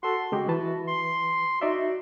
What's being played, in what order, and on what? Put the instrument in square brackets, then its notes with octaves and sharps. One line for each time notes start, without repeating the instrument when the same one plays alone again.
[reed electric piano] F#4 A4 [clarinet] C6
[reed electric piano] C#3 G#3 G4 [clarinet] F#4
[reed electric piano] E3 B4 A5
[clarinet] C6
[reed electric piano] D#4 D5 E5 [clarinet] F#4